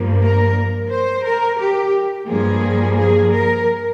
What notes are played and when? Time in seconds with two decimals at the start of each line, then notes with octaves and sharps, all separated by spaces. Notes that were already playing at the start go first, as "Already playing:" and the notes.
Already playing: G2 F3 A#3
0.22 A#4
0.91 C5
1.25 A#4
1.59 G4
2.28 G2 F3 A#3 G#4
2.97 G#4
3.31 A#4